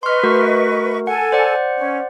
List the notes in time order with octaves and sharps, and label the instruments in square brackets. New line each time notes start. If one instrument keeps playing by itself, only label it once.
[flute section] B4 D#5 C#6 [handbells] C6 F6
[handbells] A3 F#4 A#4
[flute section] A4 G#5 [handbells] F#5
[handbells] C5 D5 F#5
[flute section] C#4